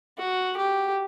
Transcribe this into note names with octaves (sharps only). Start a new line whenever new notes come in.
F#4
G4